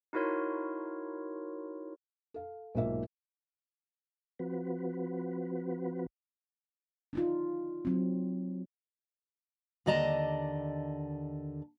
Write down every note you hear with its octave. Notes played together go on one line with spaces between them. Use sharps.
D#4 E4 F#4 A#4 C#5 C6
A4 F5
B1 G#2 A#3 F4 E5
F3 C4 F#4 B4
D4 D#4 F4
F#3 C4
D#2 D3 D5 D#5 A5 A#5